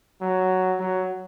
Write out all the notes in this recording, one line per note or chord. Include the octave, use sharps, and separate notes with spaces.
F#3
F#3